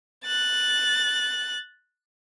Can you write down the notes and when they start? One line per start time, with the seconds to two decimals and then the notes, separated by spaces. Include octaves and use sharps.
0.24 F#6 A6